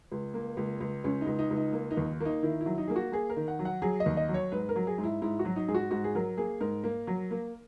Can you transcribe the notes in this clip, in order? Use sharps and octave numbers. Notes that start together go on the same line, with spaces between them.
C#2
A#3
C#2
C#2
C#2 C#4
D#4
C#2
D#4
C#2
D#4
A#3
D#4
D#2
A#3 D#4
D#3 E4
E4
F#3
D#4
A#3 G#4
F#4
A#3 G#4
A#4
D#3
F#5
F#3
F#5
F#3 G#4
D#5
D#2
D#5
F#3
C#5
G#2 B4
A#4
F#3
G#4
G#2
E4
G#2 E4
F#4
F#3
D#4
G#2 G#4
F#4
G#2 F#4
G#4
F#3 A#4
A#3 G#4
G#2 A#4
A#3
F#3
A#3